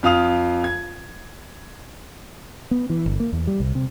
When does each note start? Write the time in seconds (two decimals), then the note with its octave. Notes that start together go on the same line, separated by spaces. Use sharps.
0.03 F2 F4 F5 D#6 F7
0.64 G#6
2.71 B3
2.90 E3
3.06 G1
3.20 A#3
3.33 E2
3.47 G3
3.60 C2
3.75 C3